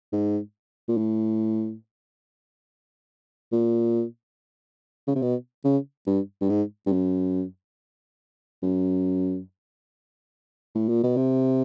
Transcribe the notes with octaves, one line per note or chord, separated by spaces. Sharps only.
G#2
A#2
A2
A#2
C#3
C3
B2
C#3
G2
G2
G#2
G2
F#2
F#2
A2
A#2
B2
C3